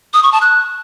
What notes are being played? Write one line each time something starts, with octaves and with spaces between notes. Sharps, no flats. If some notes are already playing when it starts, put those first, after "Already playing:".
D#6
C#6
A5
F#6